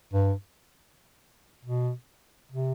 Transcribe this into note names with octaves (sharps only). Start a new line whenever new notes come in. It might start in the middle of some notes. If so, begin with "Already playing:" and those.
G2
B2
C3